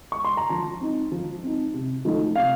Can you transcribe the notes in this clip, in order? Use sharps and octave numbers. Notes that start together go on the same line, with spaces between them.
C#6
C6
A#5
F3 A5
C4 D#4
F3
C4 D#4
C3
F3 A3 D#4
C3 F5